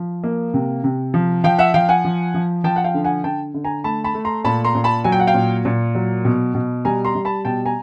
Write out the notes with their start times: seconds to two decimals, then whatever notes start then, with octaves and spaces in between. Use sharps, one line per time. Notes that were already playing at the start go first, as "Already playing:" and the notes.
Already playing: F3
0.24 A#3
0.54 C3
0.84 C3
1.14 F3
1.44 F3 F5 G5
1.59 E5 F#5
1.74 F3 F5 G5
1.89 F#5 G#5
2.05 F3
2.34 F3
2.64 F3 G5 A5
2.76 F#5
2.84 F5 G5
2.94 D3
3.04 F#5 G#5
3.24 D3 G5 A5
3.54 D3
3.64 G#5 A#5
3.84 A3 A5 B5
4.04 A5 B5
4.14 A3
4.25 A#5 C6
4.44 A#2 A5 B5
4.65 A#5 C6
4.75 A#2
4.84 A5 B5
5.04 F#3 G#5
5.12 G5
5.20 F#5
5.27 F5 G5
5.34 A#2
5.65 A#2
5.95 F#3
6.25 B2
6.55 B2
6.85 G3 G#5 A#5
7.05 A#5 C6
7.15 G3
7.25 A5 B5
7.45 B2 G5 A5
7.66 G#5 A#5